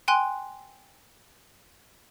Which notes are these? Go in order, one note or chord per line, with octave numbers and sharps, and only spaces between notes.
G5 G#5 C6 F#6